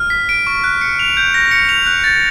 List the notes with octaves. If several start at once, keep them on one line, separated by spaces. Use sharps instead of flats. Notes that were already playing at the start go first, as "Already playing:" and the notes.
Already playing: F6
B6
D7
C#6
F#6
C#7
F7
G6
A#6
C#7
F7
F#6
A6